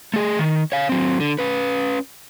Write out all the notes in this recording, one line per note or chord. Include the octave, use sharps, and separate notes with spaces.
A3 G#4
D#3
C#5 F5
F#3 C4
D3
C#4 B4